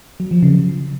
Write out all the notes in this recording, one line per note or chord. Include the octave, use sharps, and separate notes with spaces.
F#3
F3
C#3